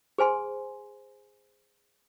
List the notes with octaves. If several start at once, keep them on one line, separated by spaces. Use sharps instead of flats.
G#4 C5 G#5 C6